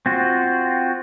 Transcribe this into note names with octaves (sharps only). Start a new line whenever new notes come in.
C4 F4 F#4